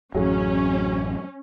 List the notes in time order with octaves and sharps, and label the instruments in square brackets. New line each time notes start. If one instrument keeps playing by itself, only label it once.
[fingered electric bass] A1 F#2 [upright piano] F#3 G#4 [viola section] C#4